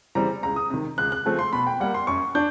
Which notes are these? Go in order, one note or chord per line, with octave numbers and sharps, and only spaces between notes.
C#3 E3 G3 C4 A#5
C#2 A#5
D#6
C3 D#3
C#2 F#6
F#6
C#3 F3 A3 C4
C6
B2 B5
G5
G3 A#3 F#5
C6
F#2 C#6
D4 G6